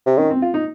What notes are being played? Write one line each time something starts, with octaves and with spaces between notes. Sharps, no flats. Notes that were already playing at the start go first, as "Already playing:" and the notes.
C3
D#3 C#4
C4
F4
D#4